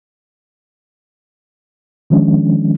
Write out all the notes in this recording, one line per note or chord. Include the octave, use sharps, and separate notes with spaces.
D#3 F3 G#3 C#4 D4